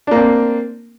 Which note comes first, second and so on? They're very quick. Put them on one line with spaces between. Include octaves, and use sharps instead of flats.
D4 A#3 C4